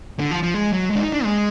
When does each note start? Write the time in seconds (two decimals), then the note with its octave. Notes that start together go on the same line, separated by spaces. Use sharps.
0.19 D3
0.31 F3
0.43 F3
0.54 G#3
0.73 F#3
0.90 G#3
0.96 D4
1.00 D#4
1.13 D4
1.24 G#3